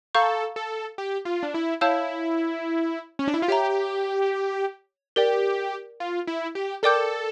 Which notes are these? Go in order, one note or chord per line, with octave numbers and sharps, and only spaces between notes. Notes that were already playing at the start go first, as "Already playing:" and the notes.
A4 F5 A#5 C#6 G6
A4
G4
F4
D4
E4
E4 C#5 F5 A5 E6 G6
C#4
D4
E4
F4
G4 C#5 E5 A#5
G4 A#4 D5 G5
F4
E4
G4
A4 A#4 D5 G5 D6 G6